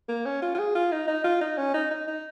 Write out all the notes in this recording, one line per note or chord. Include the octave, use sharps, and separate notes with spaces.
A#3
C#4
F4
F4
G#4
F4
D#4
D#4
F4
D#4
C#4
D#4
D#4
D#4